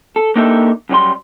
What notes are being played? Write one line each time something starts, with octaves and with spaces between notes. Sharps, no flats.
A4
A#3 D4 D#4 G4 A4 E5
F#2 F#3 G3 C6